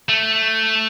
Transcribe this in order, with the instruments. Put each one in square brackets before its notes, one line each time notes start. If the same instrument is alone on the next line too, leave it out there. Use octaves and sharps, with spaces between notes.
[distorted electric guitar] A3